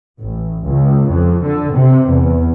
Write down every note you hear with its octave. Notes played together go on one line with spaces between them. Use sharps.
A1
C#2
F2
D3
C3
E2